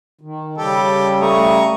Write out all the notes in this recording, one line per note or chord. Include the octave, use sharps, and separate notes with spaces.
D#3
C#3 G3 G4 A4
A3 A#5 C#6 D#6